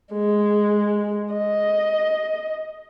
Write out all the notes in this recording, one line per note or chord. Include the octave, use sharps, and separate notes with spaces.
G#3
D#5